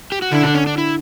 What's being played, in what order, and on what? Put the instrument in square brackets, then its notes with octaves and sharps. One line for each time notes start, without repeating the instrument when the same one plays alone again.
[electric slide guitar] G4
F#4
[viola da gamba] D3 [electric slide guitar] E4
[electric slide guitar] D4
C#4
D4
E4